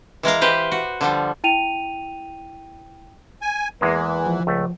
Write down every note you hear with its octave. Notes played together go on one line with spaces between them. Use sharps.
E3 G#3 A#4 F5
G4 B4 C5
F#4
D3 F3 G3
E4 G5 D#7 F7
G#5
E2 E3 G#3 A#3
F3
C#2 A3